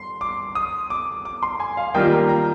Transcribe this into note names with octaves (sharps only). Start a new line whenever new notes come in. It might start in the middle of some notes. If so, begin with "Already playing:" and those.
Already playing: C6
D6
D#6
D6
D6
C6
G#5
F5
D#3 G3 A#3 F4 G5
A#5
A#5